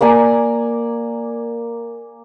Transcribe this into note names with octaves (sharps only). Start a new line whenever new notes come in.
A#3 D5 G#5 A#5